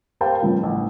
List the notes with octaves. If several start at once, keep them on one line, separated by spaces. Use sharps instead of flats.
G4 A#4 C5 F5 G5 A5
G2 C#3 F3
A1